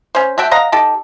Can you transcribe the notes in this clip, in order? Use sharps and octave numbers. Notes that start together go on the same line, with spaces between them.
C#4 C5
A3 F#4 E5 G5
D#5 F5 F#5 A#5
D#4 G4 A4